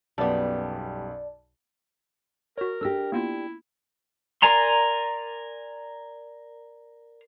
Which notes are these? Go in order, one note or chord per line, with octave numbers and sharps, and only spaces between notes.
B1 F#2 G3 B3 D5 A5
F#4 A#4 C#5
D4 G4 A4 E6 A#6
A#3 B3 E4 F4
A#4 D5 G#5 A#5 C6